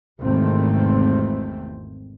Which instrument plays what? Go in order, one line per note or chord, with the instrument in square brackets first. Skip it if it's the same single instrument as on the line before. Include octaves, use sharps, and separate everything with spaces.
[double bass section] G#1 E2 C3 D#3 A3 C4